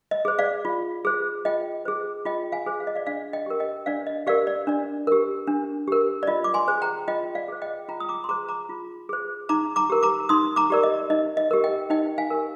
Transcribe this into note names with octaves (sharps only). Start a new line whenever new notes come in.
D#5
G#4 C5
D5 F5
F4
G#4 C5
F4 D#5 G5
G#4 C5
F4 D#5 G5
F5 G#5
G#4 C5
F5
D#5
D5 F5
D4 D5 F5
D#5 G5
G4 A#4
D#5 G5
D4 D5 F5
D#5
G4 A#4 D5 F5
D5
D4 D5
G4 A#4
D4
G4 A#4
D5
F4 D#5
D6
G#5 C6
G#4 C5
G5 A#5
F4 D#5 G5
D5 F5
G#4 C5
D#5 G5
F4 G5 A#5
D#6
A#5 D6
C6
G#4 C5 A#5 D6
A#5 D6
F4
G#4 C5
D#4 A#5 D6
A#5 D6
G4 A#4
A#5 D6
D#4 C6 D#6
A#5 D6
G4 A#4 D5
D#5
D#4 D#5
D#5
G4 A#4
D#5 G5
D#4 D#5 G5
F5 G#5
G4 A#4